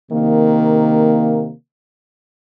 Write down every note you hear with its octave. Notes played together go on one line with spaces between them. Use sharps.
C3 D#3 A#3